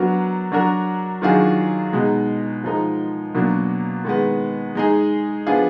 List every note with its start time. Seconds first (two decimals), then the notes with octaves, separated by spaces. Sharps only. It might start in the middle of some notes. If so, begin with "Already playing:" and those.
Already playing: F#3 B3 D4 F#4 A#4
0.52 F#3 D4 F#4 A#4
1.22 D#3 F#3 D4 F4 G#4
1.93 B2 G#3 D#4
2.64 F3 G#3 D#4 A#4
3.35 B2 F#3 A#3 D4
4.05 D#3 G#3 B3
4.75 G#3 D#4 G#4
5.47 F3 B3 D4 F4 G#4